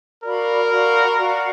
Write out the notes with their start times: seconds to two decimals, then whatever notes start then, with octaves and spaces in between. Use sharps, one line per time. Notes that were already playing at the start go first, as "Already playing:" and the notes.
0.23 F#4 A#4 D5 F5 B5
0.70 F#4 D5 F5 B5
1.17 F#4 D5 F5